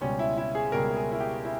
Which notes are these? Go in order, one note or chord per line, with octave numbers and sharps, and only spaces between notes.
C#2 B2 G3 C#4
E4
E4
G#4
C#2 B2 G3 A#4
G#4
E4
G4
E4